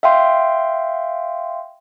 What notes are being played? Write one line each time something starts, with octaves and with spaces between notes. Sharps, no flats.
E5 F5 G5 C6